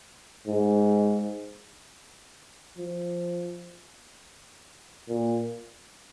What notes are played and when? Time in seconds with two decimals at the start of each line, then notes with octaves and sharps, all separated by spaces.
0.48 G#2
2.78 F3
5.09 A#2